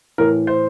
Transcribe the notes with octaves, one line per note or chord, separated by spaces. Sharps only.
A2 E3 A#4
C5